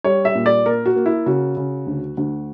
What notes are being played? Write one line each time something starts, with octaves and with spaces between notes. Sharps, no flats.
G3 C#5
E5
A#2
D5
A#3 A#4
F#4
A#3
E4
C#3 F#4
C#3
D2
D2